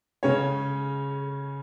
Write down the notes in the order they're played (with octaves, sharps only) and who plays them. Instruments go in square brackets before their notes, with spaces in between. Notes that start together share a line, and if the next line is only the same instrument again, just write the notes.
[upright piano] C#3 G#3 C#4 C#5